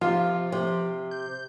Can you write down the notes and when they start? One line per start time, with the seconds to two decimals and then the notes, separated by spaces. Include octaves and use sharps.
0.01 C3 F3 F4
0.52 C3
1.11 G6